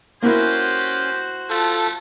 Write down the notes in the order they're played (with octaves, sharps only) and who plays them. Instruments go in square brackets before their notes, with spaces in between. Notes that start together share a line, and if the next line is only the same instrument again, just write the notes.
[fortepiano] A#3 E4 [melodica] C#4 G#5 C6 [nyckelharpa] F#4 C5 [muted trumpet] G4
[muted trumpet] A3 [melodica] F4 A4 A5